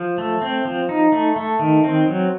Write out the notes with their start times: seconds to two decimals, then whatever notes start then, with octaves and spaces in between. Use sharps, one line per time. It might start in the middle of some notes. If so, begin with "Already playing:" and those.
Already playing: F3
0.18 A3
0.42 C4
0.65 F3
0.89 D#4
1.12 A3
1.36 A3
1.59 D#3
1.84 C4
2.08 F#3